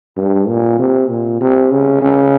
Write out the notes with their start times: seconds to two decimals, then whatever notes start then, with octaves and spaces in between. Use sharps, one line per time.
0.17 G2
0.49 A#2
0.79 C3
1.09 A#2
1.41 C3
1.71 C#3
2.02 C#3